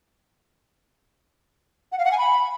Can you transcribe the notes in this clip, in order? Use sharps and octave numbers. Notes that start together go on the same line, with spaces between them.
F#5
F5
F#5
G#5
B5